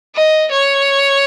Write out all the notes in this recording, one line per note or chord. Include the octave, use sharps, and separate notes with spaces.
D#5
C#5